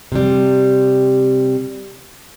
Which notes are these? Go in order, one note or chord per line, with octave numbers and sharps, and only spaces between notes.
C3 G3